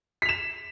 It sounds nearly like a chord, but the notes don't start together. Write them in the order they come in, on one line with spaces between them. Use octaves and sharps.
B6 F7 E7